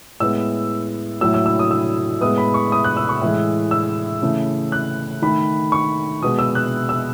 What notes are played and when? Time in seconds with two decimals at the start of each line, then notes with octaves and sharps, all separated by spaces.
0.20 A2 G#3 B3 E6
1.21 A2 F#3 A3 E6
1.34 E6
1.46 E6
1.59 D#6
1.71 E6
2.21 A2 G#3 B3 D#6
2.38 B5
2.54 C#6
2.72 D#6
2.84 F#6
2.97 E6
3.09 C#6
3.21 A2 E3 G#3
3.71 E6
4.22 C#3 E3 A3
4.72 F#6
5.22 D#3 A3 B5
5.72 C#6
6.22 B2 G#3 B3 D#6
6.39 E6
6.55 F#6
6.89 E6